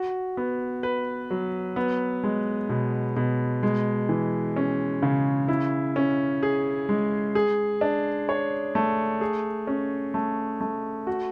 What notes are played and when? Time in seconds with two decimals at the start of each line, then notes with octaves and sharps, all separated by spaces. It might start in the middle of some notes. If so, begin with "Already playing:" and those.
Already playing: F#4
0.37 B3
0.83 B4
1.31 F#3
1.76 B3
2.23 G#3
2.69 B2
3.16 B2
3.63 G#3
4.09 E3
4.56 C#4
5.02 C#3
5.48 E4
5.96 C#4
6.43 G#4
6.89 G#3
7.35 G#4
7.81 D4
8.29 C#5
8.75 A3
9.21 G#4
9.67 C#4
10.14 A3
10.61 A3
11.07 F#4